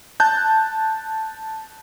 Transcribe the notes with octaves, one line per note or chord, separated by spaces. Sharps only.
A5 F#6 G6